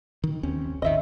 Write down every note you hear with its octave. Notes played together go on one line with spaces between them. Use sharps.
D#3
D#2 C4 C#4
G#1 D#2 D#3 D#5 E5